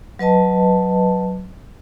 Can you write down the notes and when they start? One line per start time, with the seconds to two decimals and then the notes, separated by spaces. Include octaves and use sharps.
0.19 F#3 B4 D#5 A5